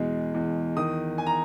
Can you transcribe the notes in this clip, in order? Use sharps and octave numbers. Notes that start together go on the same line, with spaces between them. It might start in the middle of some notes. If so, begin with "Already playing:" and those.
Already playing: E2 B2 G#3
E2
D#3 D#6
G#5
A#5